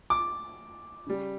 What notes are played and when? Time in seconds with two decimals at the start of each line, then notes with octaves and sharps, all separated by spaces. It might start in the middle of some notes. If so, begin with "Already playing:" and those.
0.10 D6
1.07 C#3 G3